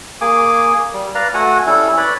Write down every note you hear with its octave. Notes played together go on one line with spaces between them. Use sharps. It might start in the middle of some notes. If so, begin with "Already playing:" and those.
A#3 G#4 G#5 D6
G3
B4 D5 F5 A#5
A3 F#4 F#5 G#5
G3 C#4 E4 A4
B4 C#5 D5 B5